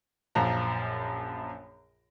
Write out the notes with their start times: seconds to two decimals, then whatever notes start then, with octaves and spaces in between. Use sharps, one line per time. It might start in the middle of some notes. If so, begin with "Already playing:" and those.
0.35 A#1 F#2 F3 A#5